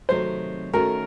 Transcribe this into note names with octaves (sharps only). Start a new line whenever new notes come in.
C3 D#3 F#3 A3 C4 C5
D#3 A3 C#4 F#4 A#4